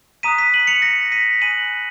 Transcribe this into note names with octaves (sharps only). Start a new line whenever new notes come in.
A#5 D#6 F#6 B6 D#7
B6 D#7
D#7 F#7
C#7 F7
A#6 C#7
B6 D#7
G#5 B5 D#6 F#6 D#7 F#7